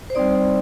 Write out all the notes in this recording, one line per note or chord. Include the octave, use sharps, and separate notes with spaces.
C5
G3 C4 D#4 D5
D5